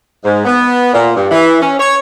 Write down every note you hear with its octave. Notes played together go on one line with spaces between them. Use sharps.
G#2
B3
A#2
G2
E3
C#4
C#5